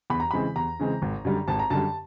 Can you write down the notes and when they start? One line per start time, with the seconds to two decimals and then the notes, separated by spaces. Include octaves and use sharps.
0.10 E2 B5
0.20 A#5
0.31 C#3 E3 G#3 C4 B5
0.56 E2 A#5
0.80 C#3 E3 G#3 C4
1.02 G#1
1.25 F#2 D3 G3
1.48 G#1 A5
1.59 A#5
1.70 F#2 D3 G3 A5